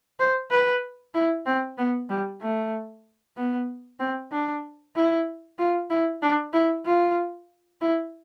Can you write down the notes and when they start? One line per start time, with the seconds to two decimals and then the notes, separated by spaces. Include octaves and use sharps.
0.20 C5
0.51 B4
1.14 E4
1.46 C4
1.78 B3
2.09 G3
2.42 A3
3.37 B3
3.99 C4
4.32 D4
4.95 E4
5.58 F4
5.90 E4
6.22 D4
6.53 E4
6.86 F4
7.81 E4